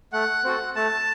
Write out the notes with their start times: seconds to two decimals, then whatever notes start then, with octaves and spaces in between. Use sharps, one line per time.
0.13 A3 F#5
0.44 C4 F#4 A4
0.76 A3 A5